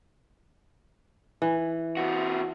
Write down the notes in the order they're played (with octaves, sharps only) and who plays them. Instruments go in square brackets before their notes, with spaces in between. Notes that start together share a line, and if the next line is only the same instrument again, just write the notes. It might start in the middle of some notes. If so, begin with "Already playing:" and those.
[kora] E3
[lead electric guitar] C3 F#4